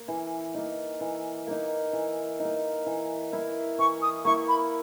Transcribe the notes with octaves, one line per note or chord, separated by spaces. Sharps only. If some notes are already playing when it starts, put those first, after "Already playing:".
Already playing: A#3
E3
A#3 D#4
E3
A#3 D#4
E3
D#4
A#3
E3
A#3 E4
E3 C#6
D#6
A#3 E4 C#6
B5